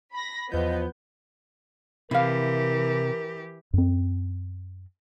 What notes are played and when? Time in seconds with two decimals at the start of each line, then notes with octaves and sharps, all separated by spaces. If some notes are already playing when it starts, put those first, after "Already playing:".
0.13 B5 A#6
0.52 E2 F3 B3 D#5 G6
2.11 C3 E3 E4 G4 A#4 F5
3.73 F#2 C4